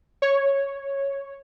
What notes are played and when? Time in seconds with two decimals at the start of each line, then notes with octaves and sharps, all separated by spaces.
0.22 C#5